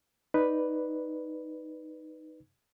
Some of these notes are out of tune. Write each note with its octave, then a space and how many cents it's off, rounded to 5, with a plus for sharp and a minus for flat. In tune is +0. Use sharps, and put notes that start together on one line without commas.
D#4 +0 B4 +0 D5 +0